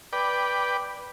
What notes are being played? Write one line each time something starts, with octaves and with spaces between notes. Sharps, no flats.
B4 D5 G5